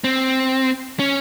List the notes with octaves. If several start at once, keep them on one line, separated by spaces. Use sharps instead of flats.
C4
C#4